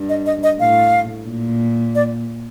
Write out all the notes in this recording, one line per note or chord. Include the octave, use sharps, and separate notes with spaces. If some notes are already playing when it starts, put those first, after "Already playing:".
Already playing: G2
D#5
D#5
D#5
A2 F5
A#2
D5